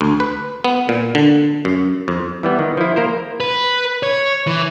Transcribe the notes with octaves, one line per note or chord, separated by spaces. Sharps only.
D2
B4
B3
A#2
D3
F#2
F2
E3 G3 B3
D#3
F3 E4
A#3 A#4 C5
B4
C#5
E3